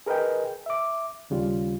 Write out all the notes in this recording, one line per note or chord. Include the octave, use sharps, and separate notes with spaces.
G#4 A#4 B4 D#5 G5
E5 D6
D#2 C#3 G3 F4